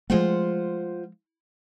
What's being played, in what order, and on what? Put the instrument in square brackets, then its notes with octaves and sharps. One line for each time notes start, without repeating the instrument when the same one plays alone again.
[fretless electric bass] F3 G#3 A3 [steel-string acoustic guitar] F4 C5 F#5